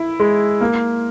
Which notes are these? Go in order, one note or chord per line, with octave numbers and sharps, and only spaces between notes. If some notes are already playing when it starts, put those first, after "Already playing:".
Already playing: E4
G#3
A#3